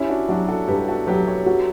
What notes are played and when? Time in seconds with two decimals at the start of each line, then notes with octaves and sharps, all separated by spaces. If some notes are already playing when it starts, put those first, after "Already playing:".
Already playing: C#4 E4 G4
0.09 D4 F#4
0.28 F#3 D4 F#4
0.48 F#4 A4
0.68 G2 G4 B4
0.88 F#4 A4
1.07 F#3 G4 B4
1.27 A4 C#5
1.46 F#4